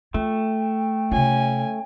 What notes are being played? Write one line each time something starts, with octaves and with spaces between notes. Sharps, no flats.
A3 F4 G5
C3 C#4 F4 G#5